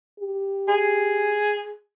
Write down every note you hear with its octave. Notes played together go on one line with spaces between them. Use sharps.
G4
G#4